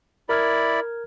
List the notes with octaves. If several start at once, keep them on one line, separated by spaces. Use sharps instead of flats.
E4 A#4 D5 B5 F6 G#6